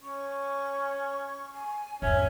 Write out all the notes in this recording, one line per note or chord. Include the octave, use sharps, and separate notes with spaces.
C#4 C#6
G#5
G#1 E2 C#4 E5